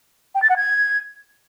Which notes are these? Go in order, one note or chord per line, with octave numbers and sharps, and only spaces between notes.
G5
A6
F#5
G#6